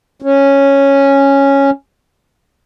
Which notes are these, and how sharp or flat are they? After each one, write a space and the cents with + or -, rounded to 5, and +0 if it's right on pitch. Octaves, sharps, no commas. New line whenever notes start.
C#4 -5